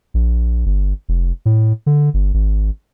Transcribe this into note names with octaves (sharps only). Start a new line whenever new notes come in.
A#1
G1
F1
A2
D3
G1
G#1